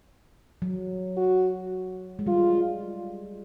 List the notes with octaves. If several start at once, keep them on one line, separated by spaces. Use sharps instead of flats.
F#3
F#4
G#3
G3 F4